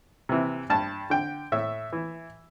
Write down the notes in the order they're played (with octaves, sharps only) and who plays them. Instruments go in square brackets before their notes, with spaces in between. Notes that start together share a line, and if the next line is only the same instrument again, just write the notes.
[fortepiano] C3 E3
G2 A5
D3 G5
A2 E5
E3